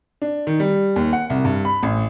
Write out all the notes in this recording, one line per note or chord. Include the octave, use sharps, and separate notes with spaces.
D4
D#3
G3
D#2
F#5
C2
G2
B5
A1